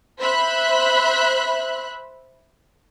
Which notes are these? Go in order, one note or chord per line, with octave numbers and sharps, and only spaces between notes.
C5 E5 B5 F#6